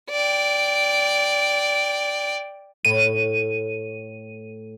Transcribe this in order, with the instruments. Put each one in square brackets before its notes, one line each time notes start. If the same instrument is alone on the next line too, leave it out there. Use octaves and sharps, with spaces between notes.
[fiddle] D5 G5
[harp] A2 [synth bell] D#7